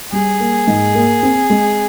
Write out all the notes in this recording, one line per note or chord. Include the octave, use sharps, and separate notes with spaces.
G3 G#4
A#3
G#2
A#3
C4
G#3